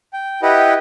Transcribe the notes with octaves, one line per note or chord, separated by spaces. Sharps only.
G5
E4 G4 B4 D#5 F#5 G5